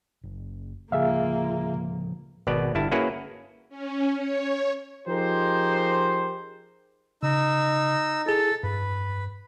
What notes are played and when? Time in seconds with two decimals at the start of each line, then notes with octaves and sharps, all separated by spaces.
0.24 F#1
0.92 A2 C#3 F3 A#3 F4 G#4 E5 F5
2.47 G#1 B2 B3 D5
2.75 G1 G2 E4 A5
2.92 A#3 C#4 E4 F#4 G#4 B4
3.69 C#4
4.17 C#5
5.08 F3 D#4 G4 G#4 A#4 C5
7.23 C#3 D#4 E6
8.26 E4 G#4 A4
8.63 G2 B4